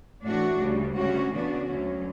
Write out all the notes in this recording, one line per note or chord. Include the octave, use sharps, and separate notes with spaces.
A2 E3 A3 D4 F#4
D2 C#3 G3
D2 C#3 G3 C#4 F#4
C#3 E3 B3 D4 F#4
D2 D3 F#3 C#4